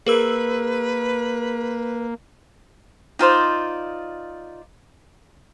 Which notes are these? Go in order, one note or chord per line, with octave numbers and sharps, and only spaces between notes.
A#3 G#4 A#4 B4 E6
D#4 F4 C5 D5